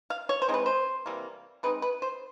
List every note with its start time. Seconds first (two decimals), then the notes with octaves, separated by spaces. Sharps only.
0.10 F5
0.29 C#5
0.42 C5
0.49 E3 G#3 C4 D#4
0.54 B4
0.66 C5
1.06 C3 E3 G3 A#3
1.63 E3 G#3 C4 D#4 B4
1.82 B4
2.02 C5